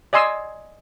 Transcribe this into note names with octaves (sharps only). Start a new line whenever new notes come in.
D5 D#5 G#5 C6 E6